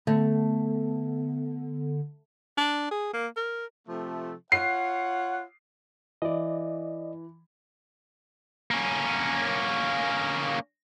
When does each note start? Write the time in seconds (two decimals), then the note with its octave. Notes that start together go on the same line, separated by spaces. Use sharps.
0.07 D3 A3 B3
2.57 D4
2.91 G#4
3.13 A#3
3.37 A#4
3.88 C3 F3 A3
4.52 F4 C#5 F#5 C7
6.22 E3 D5 D#5
8.71 A#3 C#4